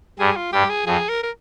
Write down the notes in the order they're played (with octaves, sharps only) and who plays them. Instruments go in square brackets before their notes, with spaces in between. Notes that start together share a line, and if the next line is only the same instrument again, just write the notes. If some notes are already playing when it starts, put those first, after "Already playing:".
[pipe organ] G2 G3 [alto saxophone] G#4
[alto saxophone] F4
[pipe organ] G2 G3 [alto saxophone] G4
[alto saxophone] G#4
[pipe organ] F2 F3 [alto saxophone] G#4
[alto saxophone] A#4
A#4